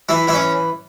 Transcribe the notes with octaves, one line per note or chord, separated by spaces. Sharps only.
E3 E4
E3 E4
C#4